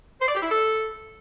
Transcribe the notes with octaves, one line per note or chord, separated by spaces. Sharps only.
C5
D5
G4
E4
A4